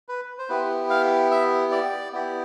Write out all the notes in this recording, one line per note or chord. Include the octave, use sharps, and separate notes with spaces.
B4
C5
B3 E4 G4 B4
F5
E5
D5
B3 E4 G4